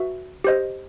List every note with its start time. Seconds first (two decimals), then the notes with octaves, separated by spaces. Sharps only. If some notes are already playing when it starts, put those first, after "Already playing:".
Already playing: F#4 B4 E5
0.44 G4 C5 D#5